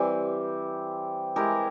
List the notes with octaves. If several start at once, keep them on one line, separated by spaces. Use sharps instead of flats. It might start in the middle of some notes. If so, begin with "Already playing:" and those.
Already playing: E3 G3 C4
G#3 E4 G4 A#4